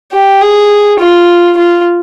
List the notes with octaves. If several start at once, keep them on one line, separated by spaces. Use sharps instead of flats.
G4
G#4
F4
F4